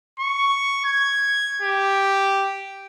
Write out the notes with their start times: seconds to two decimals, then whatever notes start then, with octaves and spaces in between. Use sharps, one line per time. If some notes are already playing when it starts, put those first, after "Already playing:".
0.20 C#6
0.85 G#6
1.62 G4